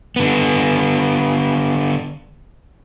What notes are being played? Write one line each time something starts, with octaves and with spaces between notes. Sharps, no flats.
D3 B3